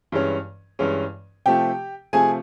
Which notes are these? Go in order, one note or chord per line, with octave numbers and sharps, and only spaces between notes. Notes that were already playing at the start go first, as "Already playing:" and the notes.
G2 E3 G#3 C#4
G2 E3 G#3 C#4
C3 F3 A3 G4 G5
C3 F3 A3 G#4 G#5